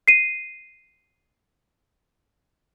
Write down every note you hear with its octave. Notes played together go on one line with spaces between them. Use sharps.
C7 D#7